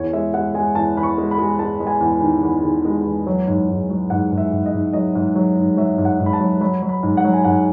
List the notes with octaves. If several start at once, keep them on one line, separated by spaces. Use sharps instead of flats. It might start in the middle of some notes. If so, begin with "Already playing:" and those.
Already playing: E2 C#5
G#3 E5
G#3 F#5
G#3 G#5
E2 A5
E2 B5
C#6
G#3
B5
G#3
G#3 A5
G#3
G#5
E2
D#3
E2
D#3
G#3
E2
F#3
G#2
G#2
F#3
G#2 F#5
G#2
E5
G#2
D#5
G#2
F#3 D#5
G#2
F#3
G#2
F#3 E5
G#2
F#5
G#2
B5
A5
F#3
F#3 B5
F#3
B5
G#2
F#5
F#3
G#5
G#2 F#5